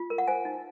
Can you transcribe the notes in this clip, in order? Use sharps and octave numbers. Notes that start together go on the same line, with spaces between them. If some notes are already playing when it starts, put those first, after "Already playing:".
Already playing: F4
A#4
F#5
C5 G#5
D#4